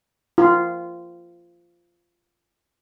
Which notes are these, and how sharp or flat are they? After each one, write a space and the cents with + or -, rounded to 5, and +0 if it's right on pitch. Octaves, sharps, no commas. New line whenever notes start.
F4 -15